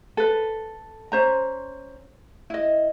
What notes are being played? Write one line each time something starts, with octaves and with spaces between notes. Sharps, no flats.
A4 B4
C#4 C5 A#5
E4 D#5